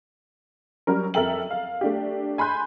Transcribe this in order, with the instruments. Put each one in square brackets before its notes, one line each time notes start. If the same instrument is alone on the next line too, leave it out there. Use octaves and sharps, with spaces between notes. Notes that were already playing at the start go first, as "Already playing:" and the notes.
[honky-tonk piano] F#3 G3 C#4 A#4
F2 A4 A#4 E5 G5 F#7
F5
A3 D4 G4
G#5 B5 C6 F#6 G6